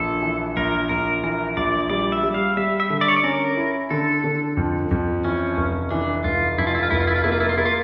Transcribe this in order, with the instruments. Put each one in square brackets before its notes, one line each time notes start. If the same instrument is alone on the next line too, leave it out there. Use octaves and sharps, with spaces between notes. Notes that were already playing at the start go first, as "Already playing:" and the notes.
Already playing: [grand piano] A#1 [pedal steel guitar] A4
[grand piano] E3
[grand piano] A#1 [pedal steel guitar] A#4
[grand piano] A#1 [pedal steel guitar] A#4
[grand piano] E3 [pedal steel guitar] A#4
[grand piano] A#1 [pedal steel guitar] D5
[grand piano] G3 [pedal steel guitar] D5
[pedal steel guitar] E5
[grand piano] G3
[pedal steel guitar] F5
[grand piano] G3 [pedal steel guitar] E5
[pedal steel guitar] E5
[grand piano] D3
[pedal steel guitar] D5
C#5
D5
[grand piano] C#4 [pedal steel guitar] A#4
[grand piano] E4
[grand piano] D3 [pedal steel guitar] A4
[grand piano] D3
F2
F2
[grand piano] E3 [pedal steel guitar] C#4
[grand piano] F1
[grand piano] E3 [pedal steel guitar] D4
[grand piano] F1 [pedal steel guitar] F4
[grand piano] F2 [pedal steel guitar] E4
[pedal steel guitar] F4
E4
F4
[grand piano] F1 [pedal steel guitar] E4
[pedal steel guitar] F4
E4
F4
[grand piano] A#3 [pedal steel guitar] E4
[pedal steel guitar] F4
E4
F4
[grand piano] A#3 [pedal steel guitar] E4
[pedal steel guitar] F4